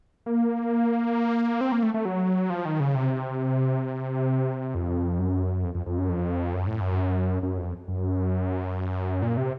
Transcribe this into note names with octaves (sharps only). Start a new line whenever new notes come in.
A#3
C4
A#3
A3
A3
F#3
F3
D#3
C#3
C3
F2
F#2
F2
F2
F2
F#2
F2
F#2
A2
F#2
F#2
F2
F#2
A#2
C3